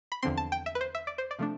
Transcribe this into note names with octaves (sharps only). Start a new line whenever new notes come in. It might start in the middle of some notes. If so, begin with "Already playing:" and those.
B5
E2 D3 F3 C4 C6
A5
G5
E5
B4
C5
E5
D5
C5
D5
C3 F3 A3 D4